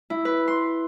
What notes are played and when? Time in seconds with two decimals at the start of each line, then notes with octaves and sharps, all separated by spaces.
0.10 E4
0.25 B4
0.48 C6